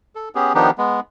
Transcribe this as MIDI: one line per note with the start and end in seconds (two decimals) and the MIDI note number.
0.15 0.29 69
0.35 0.53 59
0.35 0.53 61
0.35 0.53 67
0.35 0.53 68
0.55 0.71 51
0.55 0.71 53
0.55 0.71 59
0.55 0.71 62
0.55 0.71 63
0.55 0.71 67
0.78 1.00 56
0.78 1.00 59